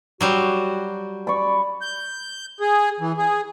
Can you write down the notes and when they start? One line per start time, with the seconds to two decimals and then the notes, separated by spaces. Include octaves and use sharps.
0.21 F#3 G3 F#4 C5
1.27 D5 B5 C#6
1.82 G6
2.60 G#4
3.00 E3
3.18 G#4